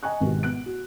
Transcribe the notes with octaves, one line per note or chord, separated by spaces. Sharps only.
D#5 G#5 A#5 C#6 F#6
G#1 G#2 B2 D#3 F#4 G4
B3 F#6 D7
F#4